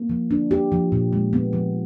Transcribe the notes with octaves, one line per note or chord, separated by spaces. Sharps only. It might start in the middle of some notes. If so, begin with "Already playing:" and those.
Already playing: A#3
F3
D4
G4
F3
A#2
G#3
B3
F3